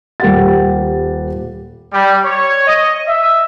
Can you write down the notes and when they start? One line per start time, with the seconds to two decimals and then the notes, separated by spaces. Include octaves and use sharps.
0.20 D#1 G3 A#4 F#5 A6
1.92 G3
2.25 C#5
2.67 D#5
3.07 E5